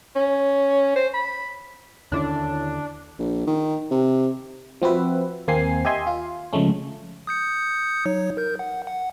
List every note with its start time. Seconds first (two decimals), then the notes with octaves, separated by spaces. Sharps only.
0.16 C#4
0.96 C5
1.14 B5
2.12 D#2 D3 C#4 D4 E4
3.19 A#1
3.47 D#3
3.91 C3
4.82 F3 C4 F#4 B4 E5
5.48 D#2 A#3 C4 G#5 C7
5.85 G4 D#5 E5 G#5 C6
6.07 F4
6.53 C#3 F3 G#3 A3 C#4
7.27 D#6 G6 C#7
8.06 F#3 D#4 C#5
8.37 A#4 G6
8.59 F#5
8.87 F#5